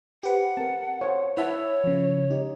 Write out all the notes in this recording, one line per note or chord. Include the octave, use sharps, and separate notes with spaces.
G4 B4 C5 F#5
C4 A#4 A5
C5 C#5 F5
E4 B4 C#5 E5 F#5 A5
C#3 F3
D#4 G4